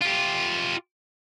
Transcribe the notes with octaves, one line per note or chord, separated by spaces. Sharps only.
F4 G4